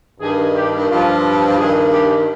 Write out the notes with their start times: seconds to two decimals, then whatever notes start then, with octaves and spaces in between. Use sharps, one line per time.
0.20 G2 D#3 G#4
0.55 G4
0.90 G2 F3 F4
1.57 G2 D#3 G#4
1.92 G4